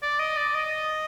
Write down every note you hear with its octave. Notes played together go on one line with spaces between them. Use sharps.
D5
D#5
D5
D#5